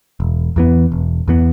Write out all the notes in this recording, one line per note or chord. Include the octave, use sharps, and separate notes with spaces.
E1
E2 E3 B3
E1
E2 E3 B3